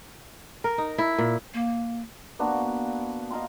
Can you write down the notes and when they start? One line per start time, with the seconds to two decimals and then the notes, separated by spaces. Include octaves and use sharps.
0.64 A#4
0.78 D#4
0.98 E4
1.18 A#2
1.54 A#3
2.39 A#3 B3 D4 F#4
3.30 D#5 F5 A#5 C6